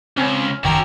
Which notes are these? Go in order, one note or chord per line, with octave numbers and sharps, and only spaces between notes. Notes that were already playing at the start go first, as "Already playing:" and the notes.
C#2 C4 C#4
F#1 D#3 F#4 G4 A4 A#4 G#6